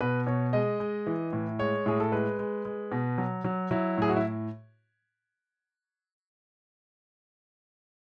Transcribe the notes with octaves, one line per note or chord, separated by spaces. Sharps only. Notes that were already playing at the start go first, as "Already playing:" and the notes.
B2 B4
B2 C#5
G#3 D#5
G#3
E3
A2
G#3 C#5
A2 G#4
A4
G#3 B4
G#3
G#3
B2
F#3
F#3
F#3 E4
A2 G#4
F#4
E4